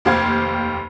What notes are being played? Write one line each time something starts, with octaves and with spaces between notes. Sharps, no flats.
F1 D#2 G4 C5 F5 G#6